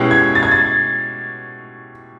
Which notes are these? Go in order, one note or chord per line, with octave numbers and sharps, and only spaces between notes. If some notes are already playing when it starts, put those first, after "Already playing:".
Already playing: B2 G#3 C#4 E4 G4
G#6
A6
G#6
A6